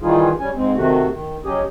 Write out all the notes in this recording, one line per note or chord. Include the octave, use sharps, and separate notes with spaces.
D#3 E3 G3 D#4 F4 G#4
G3 C#4 G#5
G#2 G#3 C4
C3 D#3 A3 F#4
D#3
F#3 C#4 G4 G#4 D#5